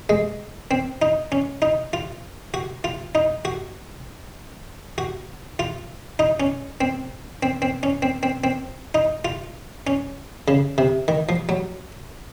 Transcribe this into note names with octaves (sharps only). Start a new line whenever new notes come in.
G#3
C4
D#4
C#4
D#4
F4
F#4
F4
D#4
F#4
F#4
F4
D#4
C#4
C4
C4
C4
C#4
C4
C4
C4
D#4
F4
C#4
C#3
C3
D#3
F3
F#3